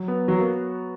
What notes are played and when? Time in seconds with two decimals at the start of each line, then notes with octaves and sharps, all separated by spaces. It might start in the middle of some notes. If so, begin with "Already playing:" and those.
Already playing: F#3
0.08 B3
0.28 F#3 F#4
0.38 A#3